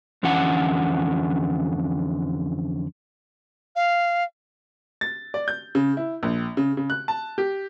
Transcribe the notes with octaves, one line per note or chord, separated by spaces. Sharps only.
F2 D3 E3 C#4 F#5
F5
A6
D5
G6
C#3
E4
A#1
C#3
C#3
F#6
A5
G4